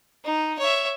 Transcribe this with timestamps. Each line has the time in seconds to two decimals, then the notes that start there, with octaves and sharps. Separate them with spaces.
0.25 D#4
0.59 C#5 E5